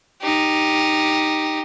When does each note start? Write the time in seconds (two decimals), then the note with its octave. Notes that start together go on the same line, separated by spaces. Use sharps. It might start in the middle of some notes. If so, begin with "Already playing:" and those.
0.22 D#4 G4